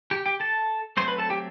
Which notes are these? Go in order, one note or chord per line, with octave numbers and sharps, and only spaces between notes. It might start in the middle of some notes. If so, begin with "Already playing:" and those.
G4 G5
G4 G5
A4 A5
F#3 A3 C4 C5 C6
B4 B5
A4 A5
G4 G5